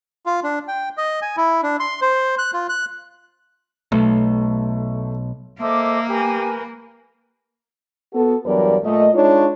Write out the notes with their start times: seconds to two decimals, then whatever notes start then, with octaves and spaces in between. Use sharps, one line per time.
0.26 F4
0.43 D4
0.68 G5
0.97 D#5
1.22 G#5
1.37 E4
1.63 D4
1.80 C6
2.01 C5
2.39 F#6
2.53 F4
2.69 F#6
3.92 B1 A3
5.61 A#3 A4 C5 D#5 E5 D6
6.09 G4 A#4 B4 G#5
8.13 B3 F#4 A4
8.45 E2 G2 F#3 A#4 B4 D5
8.84 A#2 A3 D#5
9.14 G#3 D4 D#4 F4 C#5